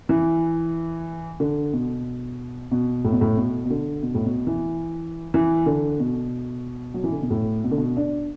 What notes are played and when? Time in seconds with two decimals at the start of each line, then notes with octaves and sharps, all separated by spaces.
0.09 E3
1.40 D3
1.73 B2
2.71 B2
3.05 A2
3.12 B2
3.21 A2
3.37 B2
3.65 B2
3.70 D3
4.03 B2
4.15 A2
4.25 B2
4.47 E3
5.34 E3
5.66 D3
6.00 B2
6.94 F#3
7.04 E3
7.12 D3
7.22 B2
7.31 A2
7.64 B2
7.71 D3
7.78 B2
7.97 D4